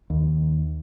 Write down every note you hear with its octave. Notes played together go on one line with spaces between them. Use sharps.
D#2